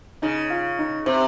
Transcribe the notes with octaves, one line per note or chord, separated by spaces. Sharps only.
C#3 D#4
F4
D#4
C3 C4